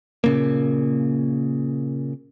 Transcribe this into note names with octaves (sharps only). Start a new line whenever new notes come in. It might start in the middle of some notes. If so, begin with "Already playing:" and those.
A#2 C#3 A#3